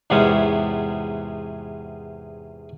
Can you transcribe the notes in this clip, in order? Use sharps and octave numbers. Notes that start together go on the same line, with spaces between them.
E2 G#2 C3 B3 C#4